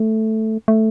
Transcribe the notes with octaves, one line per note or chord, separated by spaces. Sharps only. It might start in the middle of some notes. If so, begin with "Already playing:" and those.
Already playing: A3
A3